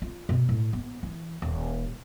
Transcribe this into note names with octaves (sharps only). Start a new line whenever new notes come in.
F4
B2
A2
B3
E3
D#1